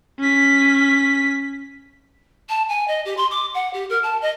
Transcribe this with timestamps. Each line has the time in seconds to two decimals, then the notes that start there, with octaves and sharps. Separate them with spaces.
0.20 C#4 B6
2.49 A5
2.69 G#5
2.87 D#5
3.05 G4
3.17 C6
3.31 D6
3.54 F#5
3.73 G4
3.89 A#4
4.03 A5
4.21 D#5